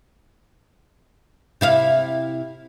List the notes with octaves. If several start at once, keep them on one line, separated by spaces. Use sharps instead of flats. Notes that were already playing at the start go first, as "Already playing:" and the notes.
C3 E4 F5